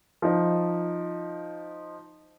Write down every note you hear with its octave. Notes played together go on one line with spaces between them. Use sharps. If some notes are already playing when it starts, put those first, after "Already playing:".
F3 D#4